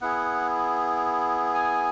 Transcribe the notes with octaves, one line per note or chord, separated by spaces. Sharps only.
B3 E4 G#4 F#5
G#5